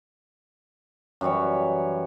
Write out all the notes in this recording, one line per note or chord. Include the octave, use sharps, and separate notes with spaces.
F#2 E3 G3 C#5